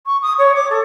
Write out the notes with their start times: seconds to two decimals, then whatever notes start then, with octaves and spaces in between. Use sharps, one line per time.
0.06 C#6
0.22 D#6
0.39 C#5
0.55 D6
0.70 A4